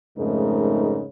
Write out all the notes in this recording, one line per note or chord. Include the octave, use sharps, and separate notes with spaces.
F2 G#2 C#3 A3 D#4 A#4